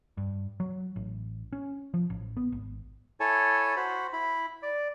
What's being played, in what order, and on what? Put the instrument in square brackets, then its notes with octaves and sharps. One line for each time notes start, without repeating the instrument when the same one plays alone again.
[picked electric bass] G2
F#3
A1
C#4
F3
A1
B3
G#1
[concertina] E4 A4 C#5 G#5 A5
F#4 C5 B5
E4 B5
D5